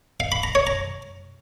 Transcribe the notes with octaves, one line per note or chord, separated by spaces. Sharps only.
F5
B5
A#5
C#5
A#5